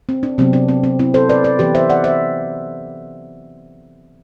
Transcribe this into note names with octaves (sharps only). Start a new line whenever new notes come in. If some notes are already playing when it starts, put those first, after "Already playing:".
C4
D4
C3 F#3 B3 C4
D4
C4
C4
C4 E4
A4 C5
B4 D5
B4 D5
E3 B3 G4 B4
C5 E5
D5 F#5
C5 E5